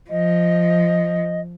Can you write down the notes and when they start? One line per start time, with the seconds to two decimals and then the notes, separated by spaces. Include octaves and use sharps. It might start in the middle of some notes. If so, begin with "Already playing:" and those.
0.10 F3 D#5